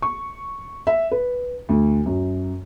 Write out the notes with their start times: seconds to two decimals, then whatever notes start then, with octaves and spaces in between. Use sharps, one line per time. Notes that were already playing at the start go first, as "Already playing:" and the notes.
0.02 C#6
0.87 E5
1.11 B4
1.69 D2
2.06 F#2